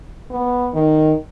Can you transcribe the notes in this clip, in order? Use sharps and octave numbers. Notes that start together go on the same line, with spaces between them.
B3
D#3